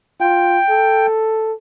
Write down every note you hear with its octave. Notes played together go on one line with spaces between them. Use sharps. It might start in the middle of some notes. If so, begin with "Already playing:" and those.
F4 G5
A4